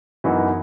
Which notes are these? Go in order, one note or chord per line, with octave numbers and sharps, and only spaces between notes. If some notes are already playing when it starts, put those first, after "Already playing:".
F#2 E3 B3 D#4 F#4